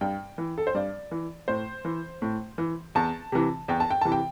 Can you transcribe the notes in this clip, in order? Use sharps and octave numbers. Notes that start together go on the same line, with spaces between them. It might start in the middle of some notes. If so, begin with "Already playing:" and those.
G2 G5
E3
A4
C5
G2 D5
E3
A2 C5
E3
A2
E3
E2 A5
C3 E3
E2 G5
A5
G5
C3 E3 A5
G5